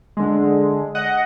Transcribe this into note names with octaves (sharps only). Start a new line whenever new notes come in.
D3 G#3
D#5 F#5